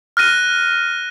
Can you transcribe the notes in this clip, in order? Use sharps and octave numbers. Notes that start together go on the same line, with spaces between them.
F6 F#6 A#6 D#7